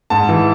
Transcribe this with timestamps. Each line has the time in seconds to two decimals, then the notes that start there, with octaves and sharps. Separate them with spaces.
0.10 G#2 A5
0.29 E3